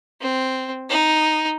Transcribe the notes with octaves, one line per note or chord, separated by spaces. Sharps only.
C4
D#4